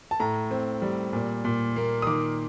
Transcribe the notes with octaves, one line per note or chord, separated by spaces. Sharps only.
A5
A2 A#5
C4
G3
A#2
A#2
A#3
D#6
D#3 D6